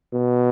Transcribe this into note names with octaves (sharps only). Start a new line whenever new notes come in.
B2